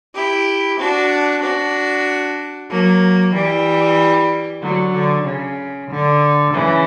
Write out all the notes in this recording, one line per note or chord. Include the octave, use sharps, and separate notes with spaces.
E4 G4
D4 F#4
D4 F#4
F#3 A#3
E3 G3
D3 F#3
D3
C#3
D3
C#3 E3